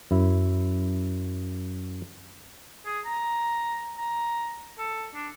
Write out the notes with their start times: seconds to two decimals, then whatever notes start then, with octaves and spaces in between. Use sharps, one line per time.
0.11 F#2 E4 E5
2.85 G#4
3.06 A#5
3.98 A#5
4.79 A4
5.15 D4